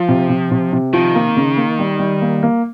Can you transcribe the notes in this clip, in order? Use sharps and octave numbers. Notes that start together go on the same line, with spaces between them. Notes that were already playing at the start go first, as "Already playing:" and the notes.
Already playing: F3 F4
C3
C3
C3
C3
D#3 F3
A#3
C#3
A#3
G3
G3
A#3
A#3